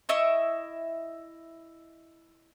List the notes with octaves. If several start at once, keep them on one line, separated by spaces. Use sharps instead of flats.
E4 D#5 E5 C#6